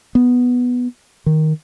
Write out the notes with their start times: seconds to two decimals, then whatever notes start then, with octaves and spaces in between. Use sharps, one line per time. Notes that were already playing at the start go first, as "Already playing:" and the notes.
0.15 B3
1.26 D#3